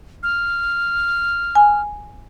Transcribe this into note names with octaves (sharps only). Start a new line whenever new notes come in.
F6
G#5